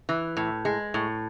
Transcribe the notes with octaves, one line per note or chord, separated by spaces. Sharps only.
E3
A2
G#3
A2